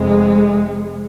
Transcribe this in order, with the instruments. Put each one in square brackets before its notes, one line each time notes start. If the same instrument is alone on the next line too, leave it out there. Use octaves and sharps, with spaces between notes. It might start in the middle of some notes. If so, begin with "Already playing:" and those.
Already playing: [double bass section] F1 F2 C3 G#3